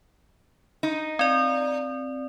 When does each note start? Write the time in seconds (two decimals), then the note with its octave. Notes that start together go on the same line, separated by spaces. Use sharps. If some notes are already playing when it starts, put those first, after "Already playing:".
0.83 D#4
1.19 C4 D5